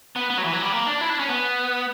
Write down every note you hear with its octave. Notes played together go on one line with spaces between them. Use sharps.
B3
B3
F#3
E3
F#3
G3
A#3
D4
E4
D4
C#4
B3